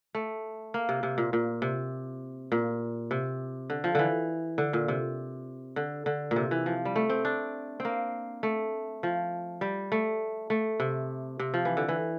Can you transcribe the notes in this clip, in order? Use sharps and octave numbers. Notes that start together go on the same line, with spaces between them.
A3
A#3
C3
C3
A#2
A#2
C3
A#2
C3
D3
F3
D3 E3
D3
A#2
C3
D3
D3
A#2
C3
E3
F3
G3
A3
C4
D4
C4
A#3
A3
F3
G3
A3
A3
C3
C3
F3
E3
D3
E3